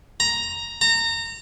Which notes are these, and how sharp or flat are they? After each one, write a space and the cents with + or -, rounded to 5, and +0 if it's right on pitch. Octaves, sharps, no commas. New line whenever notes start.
A#5 +5
A#5 -25